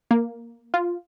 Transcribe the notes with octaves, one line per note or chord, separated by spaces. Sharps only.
A#3
F4